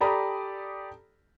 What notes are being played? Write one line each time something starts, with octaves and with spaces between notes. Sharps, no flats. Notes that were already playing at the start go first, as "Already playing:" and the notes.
G4 A4 D5 A#5 B5 D#6